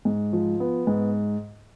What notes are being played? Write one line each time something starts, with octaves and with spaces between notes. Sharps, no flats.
G#2
F3
B3
G#2